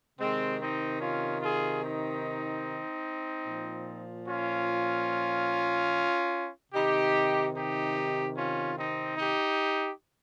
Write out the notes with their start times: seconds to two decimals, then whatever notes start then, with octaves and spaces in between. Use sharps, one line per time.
0.19 C3 D#3 G#3 C4
0.60 C4 D#4
1.01 C#4 F4
1.42 F4 G#4
1.83 C4 D#4
3.46 A#2 F3
4.28 C#4 F4
6.73 C3 D#3 D#4 G4
7.54 D#4 G4
8.36 C#4 F4
8.77 C4 D#4
9.18 D#4 G4